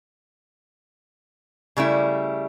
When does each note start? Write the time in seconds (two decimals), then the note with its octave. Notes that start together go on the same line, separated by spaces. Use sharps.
1.77 C#3 G3 A3 E4